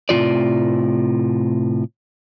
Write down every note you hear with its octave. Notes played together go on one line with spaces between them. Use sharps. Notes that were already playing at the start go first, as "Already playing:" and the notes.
A2 C3 E3 F4 D5